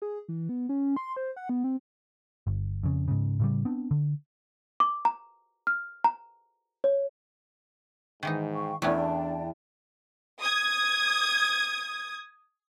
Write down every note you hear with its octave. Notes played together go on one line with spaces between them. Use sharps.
G#4
E3
B3
C#4
C6
C5
F#5
B3
C4
G1
F2 C#3
G#2 C#3
A2 C#3 G3
B3 C4 D4
D3
D6
A#5
F6
A#5
C#5
G#2 D#3 E3 D#4
F5 G5 C#6
E2 A3 B3 C#4 D4 D5 G5 A5
D#6 G#6